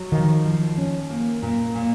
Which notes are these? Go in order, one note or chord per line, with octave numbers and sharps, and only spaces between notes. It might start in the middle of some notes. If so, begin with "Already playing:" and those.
Already playing: F#3
D#3 F3
F3
C#4
A#3
A#2
A#2